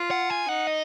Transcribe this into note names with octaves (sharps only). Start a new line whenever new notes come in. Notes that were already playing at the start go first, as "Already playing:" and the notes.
Already playing: F4
F#5
G#5
D#4 F#5
D#5